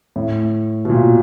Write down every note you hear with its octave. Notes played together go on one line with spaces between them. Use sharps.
A2
B2
A#2